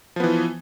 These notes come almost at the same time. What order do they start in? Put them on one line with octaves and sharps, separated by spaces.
F3 B3 E3